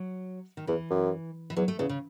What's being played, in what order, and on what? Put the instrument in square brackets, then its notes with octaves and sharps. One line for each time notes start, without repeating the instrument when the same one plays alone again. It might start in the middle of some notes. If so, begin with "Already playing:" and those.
Already playing: [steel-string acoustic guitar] F#3
D#3
[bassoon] E2 [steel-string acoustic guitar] E3
[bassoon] F#2
[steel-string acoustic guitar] E3
[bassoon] E2 [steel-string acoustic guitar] F#3
[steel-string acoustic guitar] A3
[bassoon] E2 [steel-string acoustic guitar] C#3
[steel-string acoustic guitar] C#3